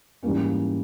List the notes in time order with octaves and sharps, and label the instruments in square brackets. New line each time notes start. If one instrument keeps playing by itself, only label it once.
[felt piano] G#2 E3 G3 A#3 C#4